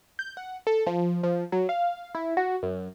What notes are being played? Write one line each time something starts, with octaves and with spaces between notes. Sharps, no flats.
G6
F#5
A4
F3
F3
F#3
F5
E4
F#4
F#2